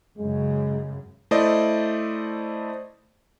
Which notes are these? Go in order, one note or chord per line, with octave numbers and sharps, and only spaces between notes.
F#2 C#3 G#3
A3 E4 C5 D5 D#5